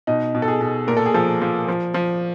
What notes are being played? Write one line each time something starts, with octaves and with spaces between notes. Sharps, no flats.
B2 D#4
B2
A4
G#4
B2
A#2 A#4
A4
G#4
F3 A4
F3
F3
F3